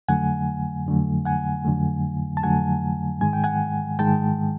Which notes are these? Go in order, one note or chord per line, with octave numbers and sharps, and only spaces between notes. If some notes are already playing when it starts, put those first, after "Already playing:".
F2 D3 F#3 A3 F#5 G#5
F2 D3 F#3 A3
F#5 G#5
F2 D3 F#3 A3
A5
F2 D3 F#3 A3 F#5 G#5
G#2 D#3 G#3 G#5
G5
F#5 G#5
G#2 D#3 G#3 G5 A5